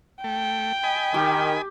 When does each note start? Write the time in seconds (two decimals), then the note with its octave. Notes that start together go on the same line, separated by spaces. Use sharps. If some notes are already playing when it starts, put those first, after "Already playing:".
0.24 A3 G5
0.84 D#5 G#5 B5
1.14 D#3 G4